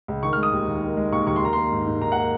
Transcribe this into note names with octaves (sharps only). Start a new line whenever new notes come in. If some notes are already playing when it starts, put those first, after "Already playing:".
C#2
D#3 C#6
F6
G#3
D#6
D#2
D#2
D#3
G#3
D#2 C#6
D#2 C#6
C6
D#3 A#5
A#3 C6
G#2
G#2
D#3 A#5
F#5
A#3